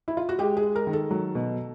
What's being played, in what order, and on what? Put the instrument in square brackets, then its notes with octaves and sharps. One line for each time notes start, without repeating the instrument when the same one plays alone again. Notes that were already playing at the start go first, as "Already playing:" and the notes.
[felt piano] E4
F4
F#4
G#3 G4
G#4
G#3
A#4
D#3
A4
F#3
B2